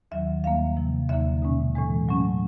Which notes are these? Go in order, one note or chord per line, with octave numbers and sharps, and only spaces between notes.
D#2 D#3 F#3 E5
D#2 D#3 G3 A#3 F5
C3 F3 A#3
D#2 D3 F#3 A#3 D#4 E5
B2 G#3 C#4
A2 E3 G#3
A2 F#3 A3 C#4